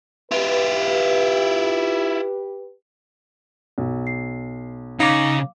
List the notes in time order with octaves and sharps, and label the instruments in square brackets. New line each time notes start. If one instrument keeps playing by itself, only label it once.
[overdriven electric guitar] E4 F4 [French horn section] G4 B4
[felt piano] B1
[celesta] C7
[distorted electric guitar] C#3 [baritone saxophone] D#4 [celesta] F5 D6